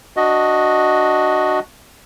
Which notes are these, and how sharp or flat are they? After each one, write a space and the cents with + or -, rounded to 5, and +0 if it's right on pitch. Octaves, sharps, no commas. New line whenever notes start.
D4 +0 F#4 +0 D#5 +5